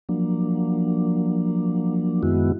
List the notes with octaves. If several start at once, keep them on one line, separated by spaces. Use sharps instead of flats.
F3 F#3 A#3 D4
F#2 D#3 G#3 B3 E4 F#4